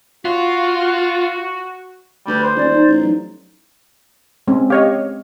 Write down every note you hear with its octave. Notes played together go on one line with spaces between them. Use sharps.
F4 F#4
D2 G3 B4
C5
D#1 C#4 D5
D#4
A1
F#3 D#4
G#3 C4 C#4
G4 C#5 D#5 F5